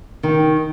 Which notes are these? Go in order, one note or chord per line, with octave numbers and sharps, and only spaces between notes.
D#3